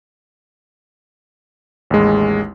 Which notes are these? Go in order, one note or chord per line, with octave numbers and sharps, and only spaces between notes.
A1 D#2 G#3